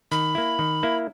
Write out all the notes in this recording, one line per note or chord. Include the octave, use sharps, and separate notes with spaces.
D#3 B5
A#3 E4
D#3
A#3 E4